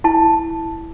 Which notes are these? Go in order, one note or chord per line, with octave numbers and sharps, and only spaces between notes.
E4 A5